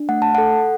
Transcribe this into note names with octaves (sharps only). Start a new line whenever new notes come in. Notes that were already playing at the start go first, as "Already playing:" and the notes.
Already playing: D4
A3 F#5
A5
A4 F#5